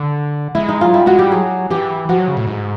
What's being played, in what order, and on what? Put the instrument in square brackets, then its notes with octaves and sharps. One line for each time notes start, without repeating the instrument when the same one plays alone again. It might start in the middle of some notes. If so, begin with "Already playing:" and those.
Already playing: [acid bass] D3
[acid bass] G#3 [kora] E4
[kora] D#4
[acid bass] F#3 [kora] F4
[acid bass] G3 [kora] E4
[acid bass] G#3 [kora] F#4
[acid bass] G3 [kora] G4
[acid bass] F#3 [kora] G#4
[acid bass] E3 [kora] G4
[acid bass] F3 [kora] F#4
[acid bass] F#3
C#3
A2
G#2